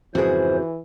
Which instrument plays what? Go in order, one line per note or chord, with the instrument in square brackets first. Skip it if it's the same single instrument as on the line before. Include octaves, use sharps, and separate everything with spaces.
[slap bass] F2 G#2 C#3 [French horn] E3 [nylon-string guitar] F#4 G#4 [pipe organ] C5